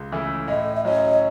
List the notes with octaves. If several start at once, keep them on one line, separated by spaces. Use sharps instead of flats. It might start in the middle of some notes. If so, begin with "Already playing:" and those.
Already playing: C#2
C#3 E3 A3 E4
A2 D#5
E5
F#3 C#4 D#5